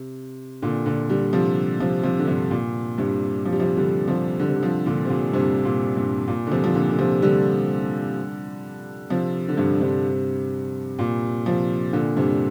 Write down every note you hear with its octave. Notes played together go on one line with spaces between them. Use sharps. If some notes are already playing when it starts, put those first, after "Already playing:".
Already playing: C3
A#2 D3
A#2 D3
D3 G3
C3 F3
C3 F3
C3 F3
D3
G2 C3
A#2
G2 C3
F3
G3
C3 F3
D3 G3
C3 F3
D3 G3
C3
D3
C3 F3
A#2 D3
C3
A#2
G2 C3
A#2
G2
A#2
D3
C3 F3
F3
A#2 D3
D3
C3 F3
D3 G3
C3 F3
D3
G2 C3
G2 C3
A#2
C3 F3
A#2 D3
G2 C3